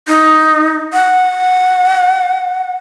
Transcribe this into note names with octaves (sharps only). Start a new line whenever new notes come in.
D#4
F#5